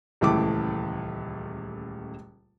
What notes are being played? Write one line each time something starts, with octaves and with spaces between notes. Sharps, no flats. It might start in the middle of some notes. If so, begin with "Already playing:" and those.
D#1 C#2 E3 A3 D6